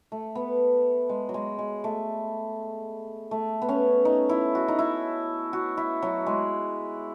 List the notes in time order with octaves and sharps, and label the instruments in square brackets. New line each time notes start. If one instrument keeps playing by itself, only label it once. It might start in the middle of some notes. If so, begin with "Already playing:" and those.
[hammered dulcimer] A3
B3
G#3
F#3
G#3
G#3
A3
A3
B3
C#4
D#4
E4
F#4
D#4
E4
F#4
E4
F#3
G#3